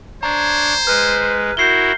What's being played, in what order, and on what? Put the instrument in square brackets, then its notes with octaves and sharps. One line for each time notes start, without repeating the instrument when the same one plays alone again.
[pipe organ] D4 C#5 [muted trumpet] C5 [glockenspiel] A#5 G#6
[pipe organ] G#3 [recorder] B4 [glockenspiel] F6
[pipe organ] E4 F#4 A#4 [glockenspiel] G6 C7 G7